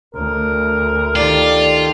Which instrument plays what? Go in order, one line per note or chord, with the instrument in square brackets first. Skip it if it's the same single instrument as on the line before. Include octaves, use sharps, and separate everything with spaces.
[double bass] D2 [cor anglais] A#4
[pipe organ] D#3 G4 A4 [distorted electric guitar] F4 [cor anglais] D5